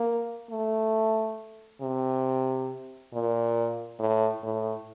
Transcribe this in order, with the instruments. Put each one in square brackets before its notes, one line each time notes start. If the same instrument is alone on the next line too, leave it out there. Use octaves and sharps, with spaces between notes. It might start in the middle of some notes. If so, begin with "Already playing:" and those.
Already playing: [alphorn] A#3
A3
C3
A#2
A2
A2